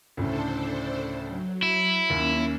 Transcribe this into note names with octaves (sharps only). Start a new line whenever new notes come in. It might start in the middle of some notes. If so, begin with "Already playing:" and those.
D2 A2 C#3 D4 A4 C5
F#3
E4
D#2 A#3 C#4